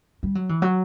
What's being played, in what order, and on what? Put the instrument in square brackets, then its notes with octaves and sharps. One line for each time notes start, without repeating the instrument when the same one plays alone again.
[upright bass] G3
F#3
E3
F#3